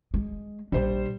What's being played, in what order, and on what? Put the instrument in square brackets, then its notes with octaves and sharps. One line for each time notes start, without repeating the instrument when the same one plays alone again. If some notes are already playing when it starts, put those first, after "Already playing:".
[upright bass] G#3
[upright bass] A#1 D4 [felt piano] G3 C5